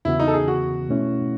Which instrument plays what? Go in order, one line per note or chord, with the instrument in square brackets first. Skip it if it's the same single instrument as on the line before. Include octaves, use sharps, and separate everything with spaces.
[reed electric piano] E2 C#3 E3 B3 F#4 [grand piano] E4
[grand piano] D#4
A4
G#4
F#4
[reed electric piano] B2 A3 C#4 E4